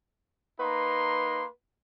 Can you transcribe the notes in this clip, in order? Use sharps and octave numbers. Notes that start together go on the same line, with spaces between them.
A#3 D#4 B4 C6